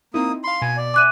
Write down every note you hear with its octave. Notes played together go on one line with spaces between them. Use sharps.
A#3 C4 D#4 E4 D#6
F5 B5 C6
B2 G#5
D5
E5 G#5 D6 F#6 D#7